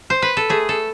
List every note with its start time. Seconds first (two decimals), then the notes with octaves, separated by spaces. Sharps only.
0.10 C5
0.22 B4
0.37 A4
0.49 A3 G#4
0.69 A4